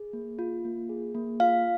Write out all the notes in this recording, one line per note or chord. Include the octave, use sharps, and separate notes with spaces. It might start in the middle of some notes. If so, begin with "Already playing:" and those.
Already playing: G#4
A#3
F4
A#3
G#4
A#3
F4 F5